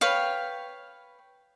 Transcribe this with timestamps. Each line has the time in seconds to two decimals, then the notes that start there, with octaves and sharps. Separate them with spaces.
0.01 B4 C#5 F5 G5